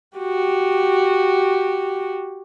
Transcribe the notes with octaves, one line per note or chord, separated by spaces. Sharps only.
F#4 G4